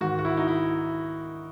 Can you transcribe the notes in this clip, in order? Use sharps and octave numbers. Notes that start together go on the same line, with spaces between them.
G#2 D#3 F#4
F#4
E4
D#4
E4